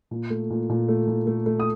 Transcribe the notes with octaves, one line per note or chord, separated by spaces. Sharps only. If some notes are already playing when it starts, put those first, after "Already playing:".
A#2
A3
A#2
A#2
A3
A#2
A3
A3
D#6